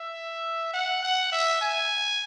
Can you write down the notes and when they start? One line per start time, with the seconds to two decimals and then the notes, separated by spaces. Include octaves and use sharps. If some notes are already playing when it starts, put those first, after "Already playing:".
Already playing: E5
0.73 F#5
1.02 F#5
1.32 E5
1.61 G#5